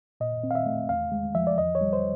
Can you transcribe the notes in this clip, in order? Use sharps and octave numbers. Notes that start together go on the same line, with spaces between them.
A#2 D#5
C4
F5
E5
A3
E2 F5
G#3
F3 E5
D5
E2 D#5
C#5
G3
C5